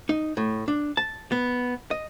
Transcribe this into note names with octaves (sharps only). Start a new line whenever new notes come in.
D#4
A2
D4
A5
B3
D#5